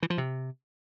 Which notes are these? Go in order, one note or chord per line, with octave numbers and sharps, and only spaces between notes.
E3
F3
C3